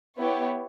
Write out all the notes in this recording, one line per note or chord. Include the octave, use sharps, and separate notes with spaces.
B3 E4 G4 C#5